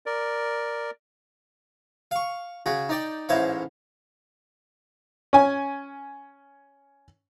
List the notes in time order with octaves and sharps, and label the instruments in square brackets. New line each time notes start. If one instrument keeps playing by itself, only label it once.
[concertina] A#4 D5
[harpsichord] F5 C#6
C#3 F#4 G#4
D#4 D5 G5
A1 G#2 E4 C5 C#5 F5
[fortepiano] C#4 G#5